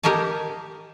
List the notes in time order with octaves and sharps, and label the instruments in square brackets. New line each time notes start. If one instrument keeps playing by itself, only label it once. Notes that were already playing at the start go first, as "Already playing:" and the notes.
[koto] G4 A#4 D#5 G#5 A5